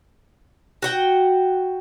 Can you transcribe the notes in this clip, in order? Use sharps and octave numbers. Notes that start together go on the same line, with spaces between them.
F#4 F#5 G5